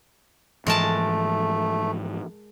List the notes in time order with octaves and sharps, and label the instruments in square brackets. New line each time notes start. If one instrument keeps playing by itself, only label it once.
[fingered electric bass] G#2 E3 F3 [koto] G#3 A#4 A5 [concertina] A3